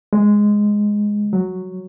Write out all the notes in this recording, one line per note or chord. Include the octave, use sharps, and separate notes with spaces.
G#3
F#3